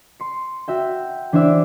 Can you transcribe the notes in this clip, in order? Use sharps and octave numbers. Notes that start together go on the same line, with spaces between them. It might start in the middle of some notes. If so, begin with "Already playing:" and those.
C6 C#7
F#4 E5 G5
E3 D4 C5 D5 E5